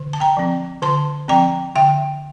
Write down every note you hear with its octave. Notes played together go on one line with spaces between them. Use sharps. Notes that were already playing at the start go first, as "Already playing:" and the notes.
Already playing: D3
A5
G5 A#5
F3 C4
D3 A5 C6
F3 C4 G5 A#5
D3 E5 G5